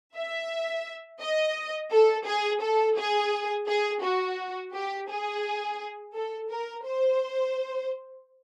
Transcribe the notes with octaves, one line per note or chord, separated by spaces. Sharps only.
E5
D#5
A4
G#4
A4
G#4
G#4
F#4
G4
G#4
A4
A#4
C5